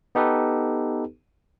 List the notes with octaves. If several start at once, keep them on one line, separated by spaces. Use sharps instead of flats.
B3 D#4 G4 A4 B4